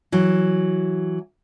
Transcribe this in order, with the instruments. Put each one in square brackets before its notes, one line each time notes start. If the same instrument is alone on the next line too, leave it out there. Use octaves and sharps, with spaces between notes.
[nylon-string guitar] E3 F#3